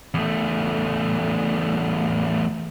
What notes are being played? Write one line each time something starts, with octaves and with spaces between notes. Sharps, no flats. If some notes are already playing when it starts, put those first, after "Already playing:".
E2 A3